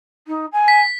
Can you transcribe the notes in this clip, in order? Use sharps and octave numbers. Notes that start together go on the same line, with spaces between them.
D#4
G#5
B6